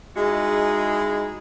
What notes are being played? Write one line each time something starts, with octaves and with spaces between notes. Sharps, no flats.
G#3 D#4 E4 F#4 G#4